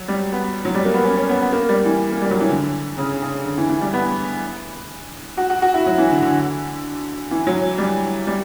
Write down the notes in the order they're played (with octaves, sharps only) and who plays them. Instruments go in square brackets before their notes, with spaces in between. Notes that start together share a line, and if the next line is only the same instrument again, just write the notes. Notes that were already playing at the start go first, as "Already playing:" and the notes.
Already playing: [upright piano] F#3
G3
B3
F#3
G3
A#3
B3
C#4
C#4
B3
B3
A#3
G3
E3
A#3
G3
F#3
E3
D3
C#3
C#3
D3
E3
E3
G3
B3
F#4
F#4
F#4
E4
F#3
E3
D3
D3
E3
F#3
G3
G3